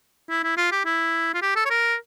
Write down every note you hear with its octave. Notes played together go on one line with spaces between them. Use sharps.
E4
E4
F4
G4
E4
F4
G4
A4
C#5
A#4